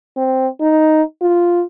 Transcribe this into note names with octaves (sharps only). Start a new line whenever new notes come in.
C4
D#4
F4